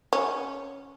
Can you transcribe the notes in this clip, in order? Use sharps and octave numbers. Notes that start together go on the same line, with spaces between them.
C#4